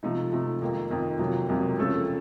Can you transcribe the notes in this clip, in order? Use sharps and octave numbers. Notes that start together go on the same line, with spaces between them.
C3 F3 A3 D#4
C3 F3 A3 D#4
F2 D#3 A#3
F2 D#3 A#3
F2 C3 F#3 A#3
F2 C3 F#3 A#3
C#3 F3 A3 C#4 A4